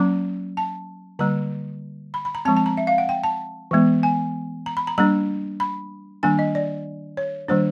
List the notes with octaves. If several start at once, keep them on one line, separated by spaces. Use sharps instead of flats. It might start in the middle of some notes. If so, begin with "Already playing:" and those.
Already playing: F#3 A#3 C#4 A#5
A5
D3 G3 A#3 A#5
B5
B5
A#5
F3 G#3 C4 A5
A5
A#5
E5
F5
F#5
G5
A5
E3 G#3 B3
G#5
A#5
B5
A#5
G3 A#3 D4 A#5
B5
D#3 G3 A#3 D4 G#5
D#5
D5
C#5
D#3 G3 A#3 D4 C5